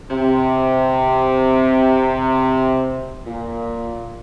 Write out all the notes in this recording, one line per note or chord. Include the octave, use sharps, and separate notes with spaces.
C3
A#2